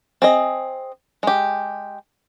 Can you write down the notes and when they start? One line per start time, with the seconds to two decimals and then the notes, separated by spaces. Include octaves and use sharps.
0.22 C4 G#4 D#5
1.23 G#3 G4